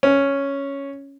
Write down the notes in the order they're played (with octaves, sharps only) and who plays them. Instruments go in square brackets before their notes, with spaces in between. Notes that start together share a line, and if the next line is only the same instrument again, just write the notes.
[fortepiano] C#4